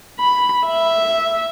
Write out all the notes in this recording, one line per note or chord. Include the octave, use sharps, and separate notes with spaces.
B5
E5